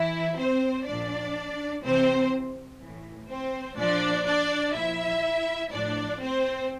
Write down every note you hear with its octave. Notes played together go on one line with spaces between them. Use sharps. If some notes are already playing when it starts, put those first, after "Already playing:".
Already playing: E3 E4
C4 C5
A#2 F3 D4 D5
C3 E3 C4 C5
E3
A2
C4 C5
A#2 F3 D4 D5
D4 D5
A#2 F3 E4 E5
A2 F3 D4 D5
C4 C5